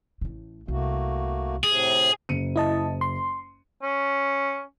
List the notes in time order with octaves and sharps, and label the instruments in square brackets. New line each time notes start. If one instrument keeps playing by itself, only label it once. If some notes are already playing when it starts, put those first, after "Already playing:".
[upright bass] A1 A2
[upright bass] C2 [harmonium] A3 A#3 F#4
[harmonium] A2 C3 [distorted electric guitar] G#4
[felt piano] F#1 C#7 D#7
[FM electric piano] E4 D#5 A5
C6
[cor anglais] C#4